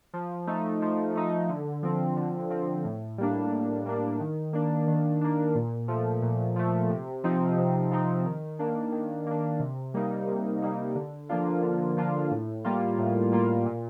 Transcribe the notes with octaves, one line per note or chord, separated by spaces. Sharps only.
F3
A3 D#4
F3
A3 D#4
D3
F3 C4
D3
F3 C4
A2
G3 A#3 D4
A2
G3 A#3 D4
D#3
A#3 D4
D#3
A#3 D4
A#2
F3 A3
A#2
F3 A3
C3
F3 C4 D#4
C3
F3 C4 D#4
D#3
A#3 D4
D#3
A#3 D4
C3
G3 A#3 D#4
C3
G3 A#3 D#4
D3
F3 A#3 D4 F4
D3
F3 A#3 D4 F4
A2
G3 A#3 F4
A2
G3 A#3 F4
A#2